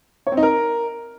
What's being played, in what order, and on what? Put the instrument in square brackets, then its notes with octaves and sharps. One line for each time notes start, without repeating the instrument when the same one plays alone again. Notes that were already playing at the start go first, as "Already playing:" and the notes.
[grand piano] C#5
C4
D#4
A#4